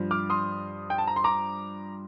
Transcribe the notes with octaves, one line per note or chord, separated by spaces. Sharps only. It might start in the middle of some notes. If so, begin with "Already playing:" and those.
Already playing: G2 F3
D6 F6
C6 D#6
G5
A5
A#5
C6
A#5 D6